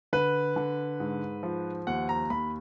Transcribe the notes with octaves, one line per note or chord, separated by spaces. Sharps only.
D3 B4
D3
G#2
F3
D#2 F#5
A#5
D#2 B5